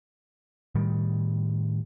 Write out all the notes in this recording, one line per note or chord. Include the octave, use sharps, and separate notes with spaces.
A2 D#3 G3